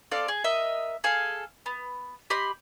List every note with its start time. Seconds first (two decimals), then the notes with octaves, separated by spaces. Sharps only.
0.11 C4 A4 D5 F5
0.28 G#4
0.44 A#4 D#5 E5
1.04 G#4 A4 F5
1.66 B3
2.30 G4 D#5 B5 C6